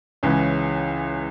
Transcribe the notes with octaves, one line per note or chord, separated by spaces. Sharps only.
C#2 C#3 E3 C#4